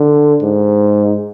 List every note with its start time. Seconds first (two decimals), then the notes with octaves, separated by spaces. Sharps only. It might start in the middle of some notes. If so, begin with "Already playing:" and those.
Already playing: D3
0.42 G#2